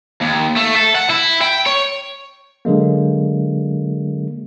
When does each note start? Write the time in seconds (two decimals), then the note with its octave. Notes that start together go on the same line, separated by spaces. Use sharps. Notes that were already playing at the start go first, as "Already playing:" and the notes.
0.22 D#2
0.57 A3
0.76 A4
0.95 F#5
1.10 E4
1.42 G5
1.66 C#5
2.65 D3 F#3 G#3 A#3